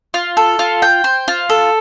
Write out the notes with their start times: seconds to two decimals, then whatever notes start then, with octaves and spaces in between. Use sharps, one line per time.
0.14 F4
0.37 A4
0.59 F4
0.82 G5
1.04 C5
1.28 F4
1.50 A4